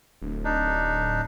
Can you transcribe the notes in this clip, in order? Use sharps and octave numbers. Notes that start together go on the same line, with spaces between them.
D1
D4 D#4